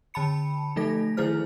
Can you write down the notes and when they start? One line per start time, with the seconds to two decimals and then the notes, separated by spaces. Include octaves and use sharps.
0.14 D3 A5 B5 C#7
0.76 F3 A3 D#4 A4 A#6
1.17 D#3 F3 E4 G#4 C5 F6